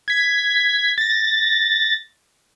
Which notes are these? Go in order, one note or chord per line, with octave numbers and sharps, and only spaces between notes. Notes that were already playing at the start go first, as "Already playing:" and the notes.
G#6 B6
A6 A#6